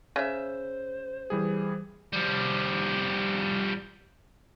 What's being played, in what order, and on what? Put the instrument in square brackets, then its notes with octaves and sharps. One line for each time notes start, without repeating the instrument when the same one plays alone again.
[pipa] C#3 E5 [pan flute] C5
[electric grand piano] E3 G3 G#4
[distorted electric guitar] F3 G3